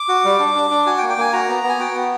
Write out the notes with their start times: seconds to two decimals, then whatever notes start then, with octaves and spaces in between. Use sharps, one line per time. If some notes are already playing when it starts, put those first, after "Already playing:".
Already playing: D6
0.08 F#4
0.24 G3
0.39 D4
0.55 D4
0.71 D4
0.86 F#4 G#5
0.98 G5
1.02 A#3
1.09 G5
1.18 A#3 G#5
1.33 F#4 A#5
1.48 B3
1.64 B3
1.69 G#5
1.79 F#4 G5
1.95 B3